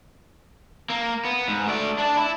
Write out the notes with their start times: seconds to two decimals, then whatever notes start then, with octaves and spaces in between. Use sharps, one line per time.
0.90 A#3
1.25 B3
1.48 G#2
1.67 A3 D5
1.98 D4 D5
2.17 E4